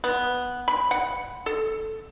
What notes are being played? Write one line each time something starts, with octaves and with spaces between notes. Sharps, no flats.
B3
B5
F#5
A4